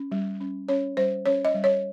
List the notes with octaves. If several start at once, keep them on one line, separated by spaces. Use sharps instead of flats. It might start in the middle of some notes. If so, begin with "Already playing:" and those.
Already playing: C#4
G3
C#4
C#4 C#5
G3 C5
C#4 C#5
D#5
G3
C#5